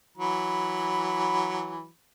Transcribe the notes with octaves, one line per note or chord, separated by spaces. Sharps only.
E3 F#3 B5